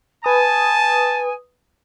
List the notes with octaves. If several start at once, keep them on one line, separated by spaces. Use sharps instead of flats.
B4 G#5 A5 D#6